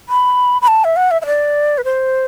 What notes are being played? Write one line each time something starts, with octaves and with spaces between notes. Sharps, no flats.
B5
B5
A5
E5
F#5
E5
E5
D5
B4
C5